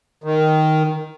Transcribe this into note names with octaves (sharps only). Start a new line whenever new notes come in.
D#3